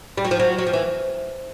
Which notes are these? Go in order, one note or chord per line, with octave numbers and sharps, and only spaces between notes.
G3
F#3
F3
F#3
F#3
F3
E3